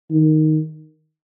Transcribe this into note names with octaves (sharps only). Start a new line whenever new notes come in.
D#3